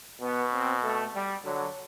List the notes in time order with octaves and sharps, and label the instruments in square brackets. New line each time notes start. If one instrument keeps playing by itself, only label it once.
[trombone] B2 [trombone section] B3
[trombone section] C4
A3
G3
[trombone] D3 [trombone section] F#3